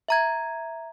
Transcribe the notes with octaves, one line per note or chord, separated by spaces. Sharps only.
E5 A#5 G#6